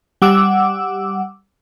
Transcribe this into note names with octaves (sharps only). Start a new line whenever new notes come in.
G3 F#5 D6 E6